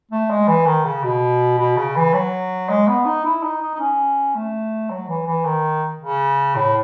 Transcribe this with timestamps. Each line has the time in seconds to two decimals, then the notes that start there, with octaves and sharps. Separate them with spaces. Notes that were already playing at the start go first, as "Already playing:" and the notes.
0.11 A3
0.30 G#3
0.48 E3
0.66 D#3
0.85 C#3
1.03 B2
1.58 B2
1.77 C#3
1.96 E3
2.14 F#3
2.69 G#3
2.87 B3
3.05 D#4
3.25 E4
3.43 D#4
3.61 D#4
3.74 D#4
3.80 C#4
4.35 A3
4.90 F#3
5.08 E3
5.27 E3
5.45 D#3
6.01 C#3
6.56 A2